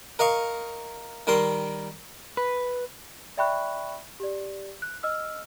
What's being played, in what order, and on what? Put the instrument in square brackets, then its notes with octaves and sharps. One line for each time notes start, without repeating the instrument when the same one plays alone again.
[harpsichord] A#4 D#5 F5 C#6
D#3 G3 A#4 C6
[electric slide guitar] B4
[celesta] D5 E5 G5 B5 C#6 F#6
G4 D5
F#6
D#5 E6 F6